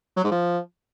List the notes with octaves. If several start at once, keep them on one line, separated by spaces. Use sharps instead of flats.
F#3
G#2
F3